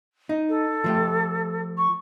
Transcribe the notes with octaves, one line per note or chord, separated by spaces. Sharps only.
D#4
A4
F3 A3 G4
C#6